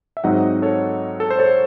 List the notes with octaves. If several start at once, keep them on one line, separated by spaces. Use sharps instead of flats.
E5
G#2 F#3 C4 D#4 D#5 F#5
A4 C#5
A4
C5
A4 C#5